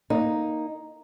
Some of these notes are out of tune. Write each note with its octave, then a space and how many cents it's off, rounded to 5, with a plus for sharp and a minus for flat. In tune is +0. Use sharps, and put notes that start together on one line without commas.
A#3 +0 D#4 +0